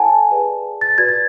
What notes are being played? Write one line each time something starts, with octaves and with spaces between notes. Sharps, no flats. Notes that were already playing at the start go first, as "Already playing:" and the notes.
Already playing: E4 A4 C#5 F#5 G#5 A5
G#4 B4 D5
A6
F#4 B4 D5 G#6
A6